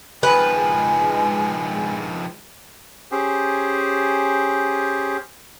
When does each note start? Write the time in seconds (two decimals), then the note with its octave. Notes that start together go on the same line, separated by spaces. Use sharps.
0.23 D#3 F3 G#3 B4 G#5
3.11 C#4 G4 G#4 C5